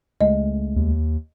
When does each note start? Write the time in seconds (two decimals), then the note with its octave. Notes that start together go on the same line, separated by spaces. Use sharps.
0.21 C#2 G#3 A3 D#5
0.76 D#2